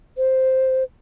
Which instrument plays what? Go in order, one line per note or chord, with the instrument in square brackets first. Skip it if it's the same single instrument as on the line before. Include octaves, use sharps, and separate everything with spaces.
[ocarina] C5